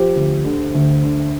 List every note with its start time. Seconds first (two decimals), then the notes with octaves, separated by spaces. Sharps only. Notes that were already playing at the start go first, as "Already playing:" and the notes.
Already playing: F3 G4 C5
0.15 D2
0.45 D3
0.74 D2
1.04 D3